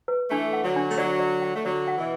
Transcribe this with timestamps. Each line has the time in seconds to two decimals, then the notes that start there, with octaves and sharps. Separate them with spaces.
0.08 B4
0.31 E3 A3 D4
0.53 F#5
0.64 D3 F#3
0.76 D4
0.88 A3
0.98 D3 F#3 D5
1.20 D5
1.42 F#5
1.56 A3
1.65 D3 F#3 D5
1.88 F#5
1.98 B2 E3